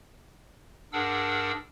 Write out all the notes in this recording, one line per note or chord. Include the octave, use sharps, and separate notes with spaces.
G2 D4 G#4 A#4 F#5 E6